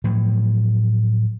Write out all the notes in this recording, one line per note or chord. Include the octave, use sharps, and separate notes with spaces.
A2 F3 F#3